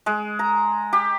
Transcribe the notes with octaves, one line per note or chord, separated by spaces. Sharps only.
G#3
A#5
G4